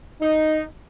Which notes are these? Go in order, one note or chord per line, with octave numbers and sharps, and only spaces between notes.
D#4